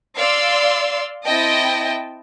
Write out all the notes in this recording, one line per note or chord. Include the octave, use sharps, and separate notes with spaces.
D5 F5 C6 E6
C4 E4 D#5 G5 A5